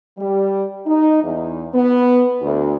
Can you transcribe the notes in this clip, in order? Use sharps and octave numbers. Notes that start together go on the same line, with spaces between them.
G3
D#4
E2
B3
D2